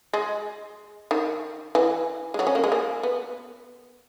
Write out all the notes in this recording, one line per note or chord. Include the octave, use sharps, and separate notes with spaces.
G#3
D#3
E3
G#3
F#3
C#4
A#3
G#3
A#3
B3